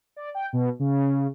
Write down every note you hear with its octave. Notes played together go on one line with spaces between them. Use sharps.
D5
G5
B2
C#3